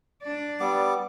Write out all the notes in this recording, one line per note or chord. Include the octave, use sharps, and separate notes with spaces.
D4 D5
G3 B3 D6